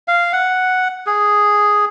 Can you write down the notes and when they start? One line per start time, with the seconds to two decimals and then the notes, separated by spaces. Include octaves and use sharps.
0.08 F5
0.33 F#5
1.06 G#4